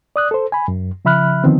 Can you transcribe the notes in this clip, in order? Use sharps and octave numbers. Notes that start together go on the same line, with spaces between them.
D5 D#6 F#6
A4 C5
G#5 B5
F#2
C#3 F3 E5 B5 F6 F#6
D3 D#3 F3 B3 C4